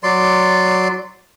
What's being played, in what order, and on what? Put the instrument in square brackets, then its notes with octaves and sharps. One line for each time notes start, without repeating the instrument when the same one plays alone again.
[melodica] F#3 D5 C6